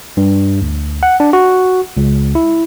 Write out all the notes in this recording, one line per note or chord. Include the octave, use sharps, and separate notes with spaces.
G2
D2
F#5
D4
F#4
C#2
E4